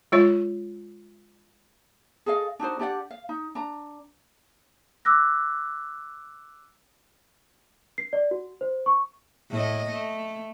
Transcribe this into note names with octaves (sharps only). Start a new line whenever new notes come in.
G#3 F4 C#5
G#4 A4 D#5 F5
D4 D#4 F#4 C5
D4 G4 D5 F#5
F5
D#4
D4 A#5
D6 E6 F#6 A#6
C7
D5
F#4
C5
C#6
A2 D#5
A3